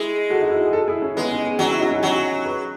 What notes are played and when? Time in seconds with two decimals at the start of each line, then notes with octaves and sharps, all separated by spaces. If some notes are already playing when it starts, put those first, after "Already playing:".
Already playing: G#3 E4 G#4
0.30 F#4 A4
0.41 D#4
0.50 E4
0.57 F#4
0.66 G#4
0.73 F#4 A4
0.88 E4 G#4
1.02 C#4 E4
1.16 G#3 B3 D#4
1.31 C#4
1.45 B3
1.59 F#3 C#4
1.70 C#4 E4
1.80 D#4 F#4
1.91 C#4 E4
2.03 F#3 D#4 F#4
2.45 G#4 B4